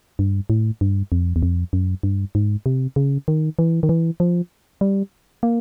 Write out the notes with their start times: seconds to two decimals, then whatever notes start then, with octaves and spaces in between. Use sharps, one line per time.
0.19 G2
0.50 A2
0.81 G2
1.12 F2
1.36 E2
1.43 F2
1.73 F#2
2.03 G2
2.35 G#2
2.66 C3
2.96 C#3
3.28 D#3
3.59 E3
3.83 D#3
3.89 E3
4.20 F3
4.81 G3
5.43 A#3